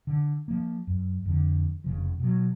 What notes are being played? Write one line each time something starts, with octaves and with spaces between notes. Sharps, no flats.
D3
F3 A#3
F#2
F2 D3
F1 C#3 F3
B2 F#3